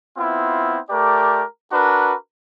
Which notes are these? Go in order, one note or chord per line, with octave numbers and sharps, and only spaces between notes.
B3 C4 E4 F4
A3 G4 A#4 D5
D4 F#4 A#4 B4